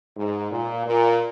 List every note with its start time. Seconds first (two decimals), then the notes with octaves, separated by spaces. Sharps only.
0.17 G#2
0.51 A#2
0.86 A#2